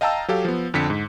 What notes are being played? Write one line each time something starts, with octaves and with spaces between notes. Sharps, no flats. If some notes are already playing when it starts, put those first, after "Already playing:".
D#5 F5 G5 A5 A#5 E6
F#3 G4 A4 F5
F3 B3
F2 D3 B6 C#7
G#2